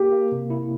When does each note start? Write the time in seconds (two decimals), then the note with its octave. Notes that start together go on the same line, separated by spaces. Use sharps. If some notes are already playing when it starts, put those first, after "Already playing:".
Already playing: A#3 G4
0.12 A#3
0.32 C3
0.50 E4